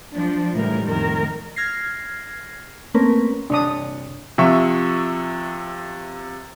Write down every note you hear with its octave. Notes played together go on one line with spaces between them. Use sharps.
F3 D4
A2 C#3 E3 G3 A#4
F2 A2 D#3 A#4
F6 G#6 A#6 C7
A3 A#3 C4 C#4 A#4 B4
G2 C3 D4 C#5 D#6
C3 F3 E5 C#6